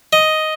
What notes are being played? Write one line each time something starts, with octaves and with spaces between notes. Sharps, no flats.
D#5